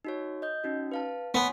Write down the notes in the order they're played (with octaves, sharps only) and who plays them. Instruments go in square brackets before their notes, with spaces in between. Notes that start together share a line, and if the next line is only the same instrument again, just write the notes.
[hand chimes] D#4 F#4 C#5
D#5 G6
C#4 D#4 F#4
B4 F5 A5
[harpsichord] B3 [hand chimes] C#5 G#5 C6